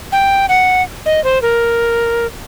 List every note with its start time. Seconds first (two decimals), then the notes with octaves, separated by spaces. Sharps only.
0.12 G5
0.49 F#5
1.06 D#5
1.24 C5
1.42 A#4